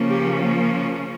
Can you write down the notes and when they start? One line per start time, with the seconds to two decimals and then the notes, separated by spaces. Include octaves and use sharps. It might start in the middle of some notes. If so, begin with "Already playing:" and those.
Already playing: C#3 F3 A#3 C#4
0.08 G4